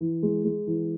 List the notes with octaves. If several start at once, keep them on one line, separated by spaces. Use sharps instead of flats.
E3
G#3
G#3
E3